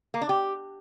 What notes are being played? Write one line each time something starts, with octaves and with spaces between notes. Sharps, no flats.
A#3
D4
G4